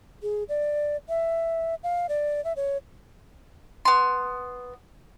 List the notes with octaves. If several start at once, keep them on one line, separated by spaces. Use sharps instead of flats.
G#4
D5
E5
F5
D5
E5
C#5
B3 C6